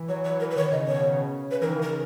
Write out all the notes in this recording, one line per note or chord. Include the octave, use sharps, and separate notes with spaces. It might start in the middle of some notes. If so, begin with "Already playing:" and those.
Already playing: E3
F#3 C#5
E3 C#5
A#4
E3
B4
D#3 C#5
C#3 D#5
B2 C#5
B2
C#3
B4
E3 A#4
D#3
C#3
A#4